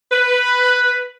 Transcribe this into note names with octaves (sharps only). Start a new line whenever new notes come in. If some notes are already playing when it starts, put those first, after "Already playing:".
B4